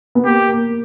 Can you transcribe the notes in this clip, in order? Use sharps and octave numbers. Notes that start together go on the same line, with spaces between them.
B3
A#3 G4
A#3